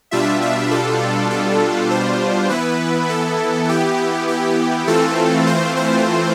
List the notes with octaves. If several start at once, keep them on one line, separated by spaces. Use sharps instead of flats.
B2 G3 D4 F4 E5
E5
A4
A4
C5
E3 B3 E4 B4
A4
G4
G4
E3 A3 C4 F4 A4
C5
C5